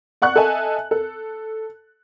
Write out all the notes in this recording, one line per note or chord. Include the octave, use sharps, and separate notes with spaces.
D5 F#5 C#6 F#6
A4 D#5 E5 G#5 A5
A4